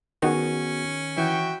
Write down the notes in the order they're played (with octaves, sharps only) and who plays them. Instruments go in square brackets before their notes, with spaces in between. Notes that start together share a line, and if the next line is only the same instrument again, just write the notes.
[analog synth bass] D#3 [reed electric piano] B3 F#4 G#4 [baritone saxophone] C#4
[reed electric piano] E3 [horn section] E4 F#4 G5